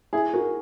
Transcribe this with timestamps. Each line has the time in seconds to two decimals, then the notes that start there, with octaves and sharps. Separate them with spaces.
0.13 E4 G#4
0.33 F#4 A#4